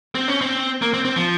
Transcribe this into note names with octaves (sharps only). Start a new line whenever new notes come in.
C4
C#4
C4
A#3
C4
C4
F3